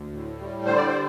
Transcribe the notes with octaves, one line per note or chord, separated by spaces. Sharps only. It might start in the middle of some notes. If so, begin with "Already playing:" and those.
Already playing: D2
A2
G3
D3 C5
D5
C5